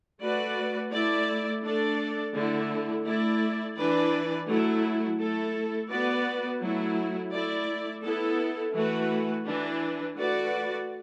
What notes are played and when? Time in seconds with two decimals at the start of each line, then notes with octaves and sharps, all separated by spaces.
0.21 A3 F#4 B4 D5
0.91 A3 E4 D5
1.63 A3 D4 A4 D5
2.34 D3 A3 E4
3.05 A3 E4 D5
3.77 E3 D4 B4 D5
4.48 F#3 A3 E4
5.18 A3 E4 A4
5.90 B3 F#4 B4 D5
6.60 F#3 A3 E4
7.32 A3 E4 D5
8.03 B3 E4 A4
8.73 E3 A3 F#4 B4
9.45 E3 D4 B4
10.16 A3 F#4 B4 D5